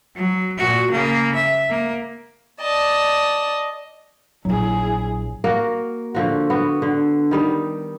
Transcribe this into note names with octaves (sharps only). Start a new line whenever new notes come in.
F#3
A#2 F#4
C#3 A#3
E5
A#3
D5 D#5 A5
A#1 F#3 E4 G#4
A#3 F#4 A#4
D3 F3 F#4
B3 F#4
D3
D#3 G3 D#4